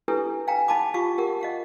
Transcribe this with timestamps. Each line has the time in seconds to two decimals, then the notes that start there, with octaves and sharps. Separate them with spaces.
0.08 D4 E4 G4 A4 B4
0.48 F5 G5 G#5 A#5
0.68 D#4 F5 A5 B5 D6
0.94 F4 G4 F5 C#6 D6
1.18 G4 A#4 F#5
1.41 D#5 F5 F#5